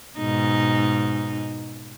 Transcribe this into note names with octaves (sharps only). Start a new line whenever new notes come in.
G#2 B2 D#4